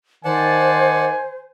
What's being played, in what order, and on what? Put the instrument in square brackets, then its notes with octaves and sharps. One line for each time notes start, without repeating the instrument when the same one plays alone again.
[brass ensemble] D#3 [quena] C5 [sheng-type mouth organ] D5 F#5 A5 [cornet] G#5